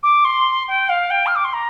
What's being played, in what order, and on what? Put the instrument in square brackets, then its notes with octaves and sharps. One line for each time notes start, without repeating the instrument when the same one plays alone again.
[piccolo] D6
C6
G5
F5
G5
F6
D6
C6
A#5